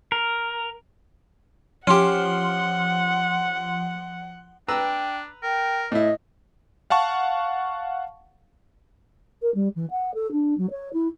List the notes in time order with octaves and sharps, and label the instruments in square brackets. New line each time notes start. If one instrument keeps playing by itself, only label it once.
[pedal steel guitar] A#4
[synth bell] F3 C6 [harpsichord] C#4 G4 [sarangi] F#5
[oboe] D4 [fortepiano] B4 A#5 E6 [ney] G5
[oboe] A#4 [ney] G5
[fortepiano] A2 E4 [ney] D#5
[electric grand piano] F5 F#5 A5 C#6
[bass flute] A#4
G3
E3
F#5
A4
D4
F#3
C#5
E4